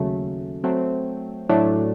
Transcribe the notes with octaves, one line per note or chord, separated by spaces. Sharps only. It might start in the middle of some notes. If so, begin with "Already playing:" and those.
Already playing: D#2 C#3 F#3 A3
F#3 A3 C4
A2 F#3 A3 D4